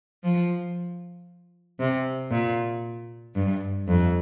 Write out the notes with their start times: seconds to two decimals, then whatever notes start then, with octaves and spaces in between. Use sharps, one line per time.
0.24 F3
1.79 C3
2.31 A#2
3.36 G2
3.88 F2